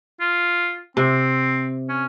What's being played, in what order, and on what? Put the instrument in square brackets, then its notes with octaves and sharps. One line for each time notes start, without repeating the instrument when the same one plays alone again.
[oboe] F4
[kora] C3 [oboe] C4
[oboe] C#4